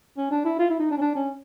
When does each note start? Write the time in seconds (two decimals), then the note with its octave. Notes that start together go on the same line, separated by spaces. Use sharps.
0.17 C#4
0.31 D4
0.44 E4
0.59 F4
0.70 E4
0.80 D#4
0.91 D4
0.97 C#4
1.01 D4
1.15 C#4